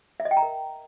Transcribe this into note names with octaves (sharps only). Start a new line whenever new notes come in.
E5
D#5
G5
A#5
A#4